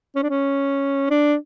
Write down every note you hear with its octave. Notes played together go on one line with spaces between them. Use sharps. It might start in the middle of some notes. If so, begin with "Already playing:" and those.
C#4
D4
C#4
D4